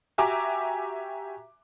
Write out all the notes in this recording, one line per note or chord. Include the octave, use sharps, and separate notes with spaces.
F#4 G4 E5 G#5 A#5 D6